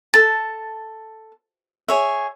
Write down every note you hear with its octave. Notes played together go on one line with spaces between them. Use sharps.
A4 A5 A6
G#4 C#5 E5